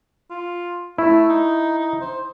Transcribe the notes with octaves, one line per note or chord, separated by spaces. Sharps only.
F4
A3 E4
D#4
D#4
C5